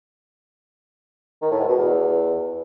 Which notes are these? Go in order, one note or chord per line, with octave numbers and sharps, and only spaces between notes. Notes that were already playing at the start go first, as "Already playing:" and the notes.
D#3
A2
G#2
B2
E2